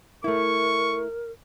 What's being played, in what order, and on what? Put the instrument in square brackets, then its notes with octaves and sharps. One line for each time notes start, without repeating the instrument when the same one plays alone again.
[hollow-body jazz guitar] A3 E4 [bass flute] A#4 [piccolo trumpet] C#6